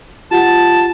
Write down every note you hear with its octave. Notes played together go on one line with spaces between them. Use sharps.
F4 G4 F#5 A5